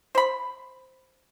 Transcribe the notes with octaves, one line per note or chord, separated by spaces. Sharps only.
C5 B5